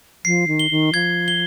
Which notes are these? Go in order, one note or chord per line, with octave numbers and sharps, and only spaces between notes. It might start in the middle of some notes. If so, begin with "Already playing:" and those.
F3 C7
D#3
G7
D#3
F3 G#6
G7